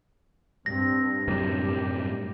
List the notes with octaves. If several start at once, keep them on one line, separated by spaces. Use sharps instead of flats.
G2 C4 A#6
F#2 A2 C3 G4